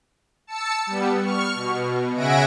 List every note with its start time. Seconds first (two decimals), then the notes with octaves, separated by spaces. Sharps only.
0.47 A5 E6 C#7
0.86 G3 B3
1.21 C#6 F6
1.54 B2
2.15 C#3 E5 F#5 G#5 A#6 D7